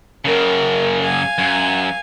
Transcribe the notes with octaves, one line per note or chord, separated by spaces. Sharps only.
F#2 C#3 A#4
F5 G#5
F#2